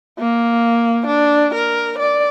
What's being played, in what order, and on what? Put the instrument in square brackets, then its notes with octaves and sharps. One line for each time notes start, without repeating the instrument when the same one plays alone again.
[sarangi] A#3
D4
A#4
D5